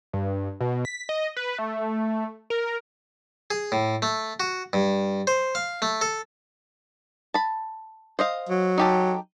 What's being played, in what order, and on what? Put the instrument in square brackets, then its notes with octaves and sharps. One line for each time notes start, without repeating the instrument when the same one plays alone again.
[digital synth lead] G2
B2
B6
D#5
B4
A3
A#4
[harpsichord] G#4
A2
A3
F#4
G2
C5
F5
A3
A4
[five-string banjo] A5 B5
C5 D#5 F5
[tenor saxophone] F#3
[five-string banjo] D#4 G4 A4